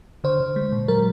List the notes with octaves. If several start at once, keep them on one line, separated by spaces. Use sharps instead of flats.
D3 C5
D3
G#3
A#2
F#3 A#4